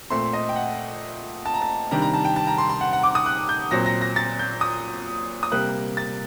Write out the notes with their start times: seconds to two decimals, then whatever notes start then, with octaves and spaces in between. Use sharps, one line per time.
0.10 A#2 A3 C4 C6
0.33 D#5
0.49 G5
0.56 F#5
1.46 A5
1.54 A#5
1.62 A5
1.91 C3 D#3 G3 D4 A#5
2.02 A#5
2.14 A5
2.25 G5
2.36 A5
2.47 A#5
2.58 C6
2.70 C6
2.81 F#5
2.93 F#5
3.03 D6
3.15 D#6
3.26 F#6
3.49 G6
3.71 A#2 F#3 C4 A#6
3.86 A#6
4.01 A#6
4.16 A6
4.39 G6
4.61 D#6
5.43 D#6
5.52 C3 G3 A#3 F#6
5.97 A6